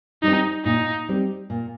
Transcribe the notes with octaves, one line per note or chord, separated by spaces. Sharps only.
G3 C4 D#4
A#2 D#4
G3 C4
A#2